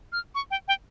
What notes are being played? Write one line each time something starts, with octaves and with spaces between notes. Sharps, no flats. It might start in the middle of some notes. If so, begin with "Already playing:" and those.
F6
C#6
G5
G5